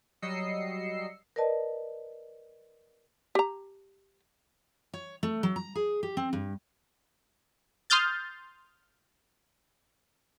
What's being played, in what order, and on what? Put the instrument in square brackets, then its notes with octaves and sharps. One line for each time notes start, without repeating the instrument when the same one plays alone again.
[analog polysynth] F#3 G3 D#5 E6 C7 C#7
[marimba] A#4 B4 D5 D#5 A5
[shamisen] G4 A#5
[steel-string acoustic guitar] C#5
A3
F#3
A#5
G#4
G4
C4
G2
[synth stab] C6 D#6 F6 G6 A6